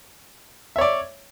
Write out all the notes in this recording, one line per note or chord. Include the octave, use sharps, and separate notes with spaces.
C#5 D5 E5